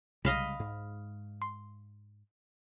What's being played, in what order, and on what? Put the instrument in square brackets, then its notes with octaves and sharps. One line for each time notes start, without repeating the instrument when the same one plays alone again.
[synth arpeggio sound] C2 [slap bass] C#3 G3 G#3 [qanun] D#5 F5 B5
[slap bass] G#2
[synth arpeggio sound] C6